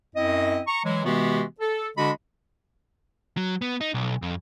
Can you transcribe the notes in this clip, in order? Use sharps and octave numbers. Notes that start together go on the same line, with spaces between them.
F#2 C4 E4 D#5
A#5 C#6
E3 F#3 G#3
C3 E3 G#3 B3 F#4 G4
A4
D3 G#3 D4 F#4 D#5 B5
F#3
B3
D#4
B1
F2